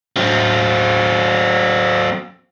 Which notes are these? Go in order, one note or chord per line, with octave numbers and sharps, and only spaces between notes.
F#3 C4